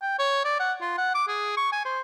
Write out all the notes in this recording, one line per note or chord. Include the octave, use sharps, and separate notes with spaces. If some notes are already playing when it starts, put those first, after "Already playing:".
G5
C#5
D5
F#5
F4
F#5
D6
G#4
C#6
G#5
C5